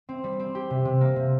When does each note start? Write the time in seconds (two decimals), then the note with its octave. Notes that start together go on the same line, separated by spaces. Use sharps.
0.09 C4
0.24 G3
0.39 C4
0.55 G4
0.70 C3
0.85 C3
1.01 A#3
1.16 C3